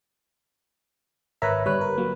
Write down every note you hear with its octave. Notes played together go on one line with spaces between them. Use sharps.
G#1 A#4 B4 C#5 E5 A#5
G1 G3 B4 C#5
A#4
F#3 A#3